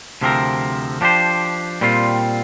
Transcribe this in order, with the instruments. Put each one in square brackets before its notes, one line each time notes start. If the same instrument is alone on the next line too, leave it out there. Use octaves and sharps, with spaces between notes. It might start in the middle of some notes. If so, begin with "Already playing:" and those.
[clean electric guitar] D2 C3 F3 C4 A#4
F3 D4 G4 C5
A#2 G3 C4 F4